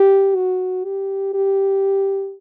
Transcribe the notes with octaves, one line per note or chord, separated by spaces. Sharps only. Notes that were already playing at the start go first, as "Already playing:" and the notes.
Already playing: G4
F#4
G4
G4